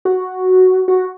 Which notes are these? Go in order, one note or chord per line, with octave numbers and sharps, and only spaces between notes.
F#4
F#4